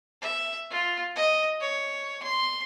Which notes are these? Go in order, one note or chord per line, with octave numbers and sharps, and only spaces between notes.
E5
F4
D#5
C#5
C6